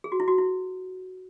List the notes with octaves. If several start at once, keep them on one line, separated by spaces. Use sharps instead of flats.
G#4
F#4
E4
F#4
E4